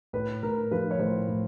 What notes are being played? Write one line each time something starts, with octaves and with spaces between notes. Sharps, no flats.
A2 B4
A2 A#4
F3 B4
C#5
A2 C5
A2